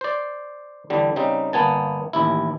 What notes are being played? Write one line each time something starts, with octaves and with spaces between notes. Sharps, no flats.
C5 D5
E2 D3 G3
C#3 G3 C4 D#4
G1 A#3 B3 G#5 A5
A1 D#2 E4